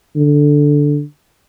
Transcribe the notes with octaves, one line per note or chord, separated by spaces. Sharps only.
D3